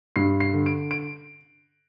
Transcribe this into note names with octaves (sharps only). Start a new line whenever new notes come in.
G2 C7
C7
D3
D7
D7